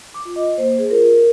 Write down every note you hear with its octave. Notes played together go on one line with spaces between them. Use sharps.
D6
F4
D#5
A#3 C5
G#4
F4 A#4